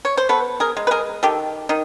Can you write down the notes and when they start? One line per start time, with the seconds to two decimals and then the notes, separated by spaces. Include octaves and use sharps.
0.05 C#5
0.17 C5
0.29 B3 A4 B4
0.60 G#4 A#4
0.77 G#3
0.87 B4
0.91 G#4 A#4
1.23 D#3 G4 A4
1.69 D#3 D#4